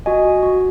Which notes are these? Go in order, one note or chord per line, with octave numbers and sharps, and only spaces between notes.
F#4 D#5 G#5
F#4
F#4